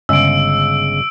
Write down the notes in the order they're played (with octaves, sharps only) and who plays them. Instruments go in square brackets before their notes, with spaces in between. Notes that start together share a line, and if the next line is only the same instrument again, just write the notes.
[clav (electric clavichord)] G1 C#3 G#3 [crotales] E6 D7